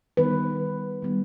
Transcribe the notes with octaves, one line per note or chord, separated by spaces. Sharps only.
D#3 G3 B3 B4
D#3 G3 B3